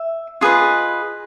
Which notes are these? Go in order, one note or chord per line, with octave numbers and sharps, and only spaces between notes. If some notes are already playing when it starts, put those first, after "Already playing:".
Already playing: E5
F4 G#4 B4 D#5